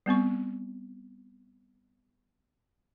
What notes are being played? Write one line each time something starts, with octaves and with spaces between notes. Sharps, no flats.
G3 B3 C4 C#6